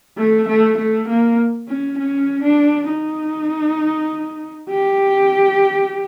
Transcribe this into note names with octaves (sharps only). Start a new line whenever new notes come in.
A3
A3
A3
A#3
C#4
C#4
D4
D#4
G4